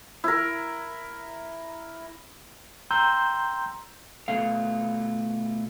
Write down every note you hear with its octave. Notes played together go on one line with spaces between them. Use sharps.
E4 A#4
G5 A#5 C6 E6 G6
B2 A3 F5